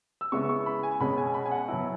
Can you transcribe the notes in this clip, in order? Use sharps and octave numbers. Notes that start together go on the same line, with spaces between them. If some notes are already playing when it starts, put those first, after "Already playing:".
E6
C#3 G#3 B3 E4 C#6
C#6
B5
G#5
B2 G#3 C#4 B5
G#5
B5
G#5
F#5
B2 F#3 B3 E4